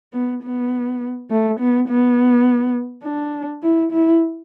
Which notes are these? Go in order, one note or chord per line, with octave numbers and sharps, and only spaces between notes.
B3
B3
A3
B3
B3
D4
E4
E4